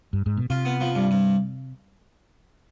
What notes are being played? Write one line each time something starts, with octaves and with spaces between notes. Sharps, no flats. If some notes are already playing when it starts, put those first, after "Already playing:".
G2
G#2
B2
C3 F4
B3
F3
G2
G2